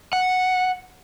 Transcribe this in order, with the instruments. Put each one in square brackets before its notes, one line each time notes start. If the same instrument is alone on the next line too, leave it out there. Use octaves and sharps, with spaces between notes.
[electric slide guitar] F#5